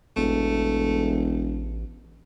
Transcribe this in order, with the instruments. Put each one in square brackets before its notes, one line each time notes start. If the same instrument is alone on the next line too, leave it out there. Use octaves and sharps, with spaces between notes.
[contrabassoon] E1 [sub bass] A1 [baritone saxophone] A3